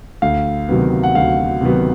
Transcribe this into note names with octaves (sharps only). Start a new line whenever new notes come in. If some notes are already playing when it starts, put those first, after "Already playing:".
D2 F5
C3 D#3 F#3 B3
F#5
D2 F5
C3 D#3 F#3 B3